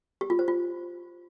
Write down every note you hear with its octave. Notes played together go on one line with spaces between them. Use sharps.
G4
F4
C5
F4